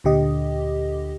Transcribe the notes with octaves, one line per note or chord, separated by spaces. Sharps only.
D2 A#2 D3 G4 D#5